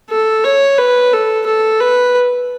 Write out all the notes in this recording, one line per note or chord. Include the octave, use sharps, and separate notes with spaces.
A4
C#5
B4
A4
A4
B4